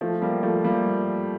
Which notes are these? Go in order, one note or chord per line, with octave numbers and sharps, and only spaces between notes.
F3 A3
G3 A#3
F3 A3
G3 A#3